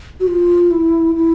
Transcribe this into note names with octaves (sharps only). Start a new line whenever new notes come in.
F#4
F4
E4
E4